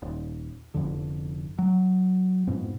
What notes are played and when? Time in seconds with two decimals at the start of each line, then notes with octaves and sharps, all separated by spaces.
0.02 D#1
0.74 F1 F2 D3
1.59 F#3
2.47 F2 G#2 B2